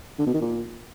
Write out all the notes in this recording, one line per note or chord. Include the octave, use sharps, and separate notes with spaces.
D3
B2
D#3
A#2